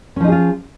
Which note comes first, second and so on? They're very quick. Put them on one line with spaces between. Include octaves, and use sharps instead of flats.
C#4 F3 D#4 G#4 F4